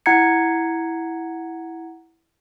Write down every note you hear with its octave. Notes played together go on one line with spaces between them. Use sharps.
E4 F#5 A#5 G#6 C#7